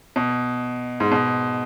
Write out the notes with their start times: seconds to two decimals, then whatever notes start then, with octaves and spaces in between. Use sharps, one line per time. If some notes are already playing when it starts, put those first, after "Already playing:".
0.16 B2
1.00 G#2
1.11 B2